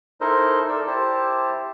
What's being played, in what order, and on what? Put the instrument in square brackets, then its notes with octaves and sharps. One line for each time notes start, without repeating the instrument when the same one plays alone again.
[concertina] D#4 E4 A4 A#4 C5 D#5
A4 A#4 D5 E6
E4 G4 C5 A5